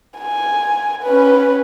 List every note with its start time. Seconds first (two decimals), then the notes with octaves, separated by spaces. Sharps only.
0.18 G#5
1.03 C#4 B4